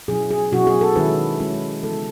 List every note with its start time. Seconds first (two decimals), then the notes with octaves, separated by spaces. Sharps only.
0.08 B2 F#3 C#4 E4 G#4
0.31 G#4
0.52 B2 F#3 C#4 E4 F#4
0.67 G#4
0.81 A4
0.96 D#3 G#3 C#4 E4 B4
1.40 D#3 G#3 C#4 E4
1.83 C#3 E3 G#3 B3 E4 A4